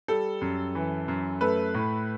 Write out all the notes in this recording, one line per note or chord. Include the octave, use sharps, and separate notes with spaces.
G3 A4
F#2
E3
F#2
A3 B4
A2